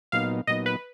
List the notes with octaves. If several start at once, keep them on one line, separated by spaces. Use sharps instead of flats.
A#2 F#3 B3 D#4 F5
A#2 F#3 B3 D#4 D#5
B4